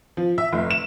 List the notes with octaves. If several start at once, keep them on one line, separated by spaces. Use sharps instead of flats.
F3
E5
F1
E7